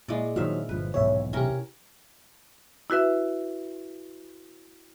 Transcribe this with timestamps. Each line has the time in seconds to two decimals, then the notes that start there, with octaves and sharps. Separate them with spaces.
0.08 A#2 G#3 E4 D5
0.36 D#3 F3 F#3 D4 E5 F5
0.69 G1 F3 B4
0.94 D#1 B1 E2 G#2 C#5 E5
1.33 C3 C#4 E4 G4 A#4
2.90 E4 F#4 B4 E5